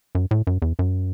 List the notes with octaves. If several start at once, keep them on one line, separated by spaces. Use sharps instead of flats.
F#2
A2
F#2
E2
F#2